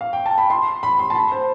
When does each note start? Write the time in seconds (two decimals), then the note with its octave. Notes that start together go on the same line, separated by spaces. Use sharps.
0.01 F5
0.13 G5
0.26 A5
0.38 B5
0.50 C6
0.83 B5
0.99 C6
1.10 A5
1.15 B5
1.32 C5